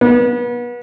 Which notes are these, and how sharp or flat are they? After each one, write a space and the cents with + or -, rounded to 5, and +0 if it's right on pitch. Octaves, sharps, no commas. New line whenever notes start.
B3 -35